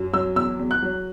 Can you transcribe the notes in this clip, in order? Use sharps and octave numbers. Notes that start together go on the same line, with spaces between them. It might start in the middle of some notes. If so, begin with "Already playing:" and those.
Already playing: F#2
F#3 E6
E2 E6
E2
F#6
F#3